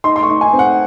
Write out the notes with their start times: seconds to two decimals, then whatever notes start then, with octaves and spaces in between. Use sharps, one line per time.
0.04 D#4 C6
0.16 C6
0.23 C#6
0.29 D#4
0.41 G#5
0.53 C4
0.59 F#5